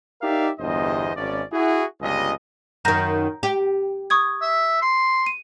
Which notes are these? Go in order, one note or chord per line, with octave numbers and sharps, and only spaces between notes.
D#4 G4 A#4 D5 E5 F5
G1 E2 G2 C5 D#5
G#1 C#4 D5
E4 F#4 G#4
G1 C#2 G3 D#5
F#2 D#3 A#5 G6 A#6
G4
C#6 D#6 G#6
E5
C6
D#7